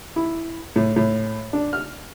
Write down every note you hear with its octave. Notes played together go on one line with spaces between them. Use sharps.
E4
A2
A2
D4
F6